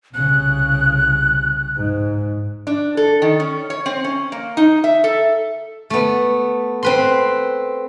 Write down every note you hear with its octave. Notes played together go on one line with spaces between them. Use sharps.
C2 C#3 F#6
G#2
D4
A4
D#3
C#4
C#5
C4
C#4
A#3
D#4
E5
A4
A3 B3
C4 B4 C6